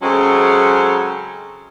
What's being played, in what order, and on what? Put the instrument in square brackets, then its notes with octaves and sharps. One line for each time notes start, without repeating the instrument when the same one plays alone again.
[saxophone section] C#3 F#3 G#3 C4 C#4 A4